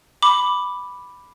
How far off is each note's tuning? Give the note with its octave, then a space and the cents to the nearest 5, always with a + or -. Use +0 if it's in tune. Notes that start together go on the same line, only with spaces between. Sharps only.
B5 +0 D6 +0